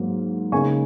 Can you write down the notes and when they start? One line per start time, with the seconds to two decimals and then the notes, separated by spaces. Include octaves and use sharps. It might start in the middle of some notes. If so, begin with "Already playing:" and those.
Already playing: G#2 F#3 A#3
0.52 C#3 A#3 D#4 G#5 C#6